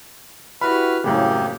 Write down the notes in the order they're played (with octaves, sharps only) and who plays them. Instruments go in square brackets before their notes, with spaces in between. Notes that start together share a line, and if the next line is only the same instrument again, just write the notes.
[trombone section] E4 F#4 G4 [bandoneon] B4 F6 [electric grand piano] B5
[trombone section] C2 A#3 [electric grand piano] F#2 A2 C#3 [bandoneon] G4